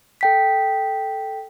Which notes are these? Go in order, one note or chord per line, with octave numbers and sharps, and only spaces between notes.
A4 G5 B6